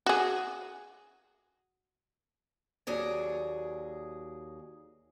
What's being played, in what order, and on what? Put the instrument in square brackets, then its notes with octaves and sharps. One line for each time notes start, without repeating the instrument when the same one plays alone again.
[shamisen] F#4 G#4
[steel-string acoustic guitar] D#2 F#3 G#4 D5